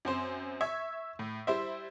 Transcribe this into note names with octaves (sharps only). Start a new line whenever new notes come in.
F#2 C4 C5
E5 C#6 E6 G#6
A2
G3 E4 C5 E5